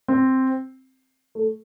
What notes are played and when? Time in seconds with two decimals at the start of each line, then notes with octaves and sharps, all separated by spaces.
0.08 C4
1.35 A3